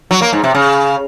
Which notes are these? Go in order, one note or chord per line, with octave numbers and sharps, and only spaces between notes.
F#3
A#3
G#2
C3
C#3